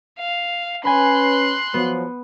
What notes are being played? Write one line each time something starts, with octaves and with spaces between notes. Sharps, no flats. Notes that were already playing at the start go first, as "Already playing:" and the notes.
F5
C#4 B4 G#5 B5 C6 F#6
F3 F#3 B3